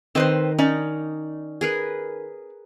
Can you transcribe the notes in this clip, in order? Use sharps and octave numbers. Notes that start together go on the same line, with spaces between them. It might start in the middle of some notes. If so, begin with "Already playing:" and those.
D#3 C4 B4 C5 D#5
C#4 D#4 D5
G#4 A#4 B4